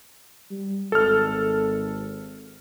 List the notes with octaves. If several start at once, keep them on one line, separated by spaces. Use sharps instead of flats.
G3
G#1 A4 F6